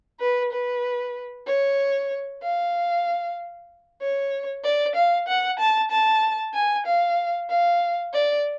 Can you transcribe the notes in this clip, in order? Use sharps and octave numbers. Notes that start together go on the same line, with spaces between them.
B4
B4
C#5
F5
C#5
D5
F5
F#5
A5
A5
G#5
F5
F5
D5